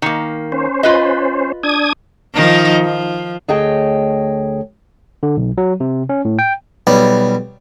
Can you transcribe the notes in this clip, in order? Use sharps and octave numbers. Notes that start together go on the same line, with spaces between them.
D#3 A#3
C#4 C5
F4 B4 D#5
D4 D#6 G#6
D#3 F3 D#4
F3
D2 G#4 C#5 D#5 G5 A5
D3
B1
F#3
C3
C#4
A2
G5
B1 G3